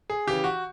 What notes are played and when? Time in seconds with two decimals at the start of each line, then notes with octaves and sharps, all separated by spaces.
0.10 G#4
0.27 C#3 E3 G4
0.44 F#4